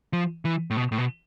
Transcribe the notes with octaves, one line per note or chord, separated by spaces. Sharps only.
F3
E3
A2
B2
A2
B2